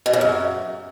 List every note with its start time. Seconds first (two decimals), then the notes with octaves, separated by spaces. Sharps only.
0.06 B2
0.13 C#3
0.21 F#2